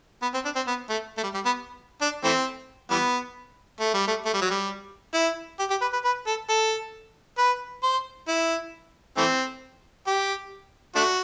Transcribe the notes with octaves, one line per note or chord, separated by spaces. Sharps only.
B3
C4
D4
C4
B3
A3
A3
G3
G3
B3
D4
E3 A3 C4
E3 G3 B3
A3
G3
A3
A3
G3
F#3
G3
E4
G4
G4
B4
B4
B4
A4
A4
B4
C5
E4
E3 A3 C4
G4
A3 D4 F#4